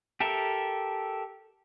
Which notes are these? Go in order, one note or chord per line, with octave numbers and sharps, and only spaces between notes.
G4 A4 A#4 E5